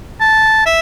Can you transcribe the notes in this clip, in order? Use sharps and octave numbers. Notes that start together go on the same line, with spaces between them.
A5
E5